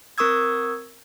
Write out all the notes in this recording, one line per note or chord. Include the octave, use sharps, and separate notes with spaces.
C4 A#4 C#6 D#6 E6 G#6